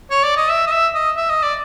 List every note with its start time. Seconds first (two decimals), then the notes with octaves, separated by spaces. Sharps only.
0.11 C#5
0.23 D5
0.37 D#5
0.50 E5
0.67 D#5
0.72 E5
0.95 D#5
1.17 E5
1.30 D#5
1.43 D5